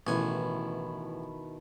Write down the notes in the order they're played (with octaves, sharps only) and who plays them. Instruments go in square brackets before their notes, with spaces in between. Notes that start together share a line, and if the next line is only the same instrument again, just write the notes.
[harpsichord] A1 G#5 [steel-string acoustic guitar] B2 D#3 E4